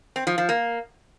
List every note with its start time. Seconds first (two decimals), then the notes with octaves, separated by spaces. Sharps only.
0.16 C4
0.27 F3
0.38 F3
0.49 A#3